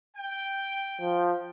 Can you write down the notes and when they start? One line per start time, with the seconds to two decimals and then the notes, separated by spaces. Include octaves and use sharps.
0.16 G5
1.00 F3